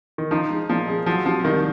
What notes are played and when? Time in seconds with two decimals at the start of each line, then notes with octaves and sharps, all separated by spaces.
0.18 D#3
0.31 F3 D#4
0.50 G#3
0.69 A#2 F3
0.88 G#4
1.06 F3 F#3
1.25 C3 F3
1.44 C2 D#3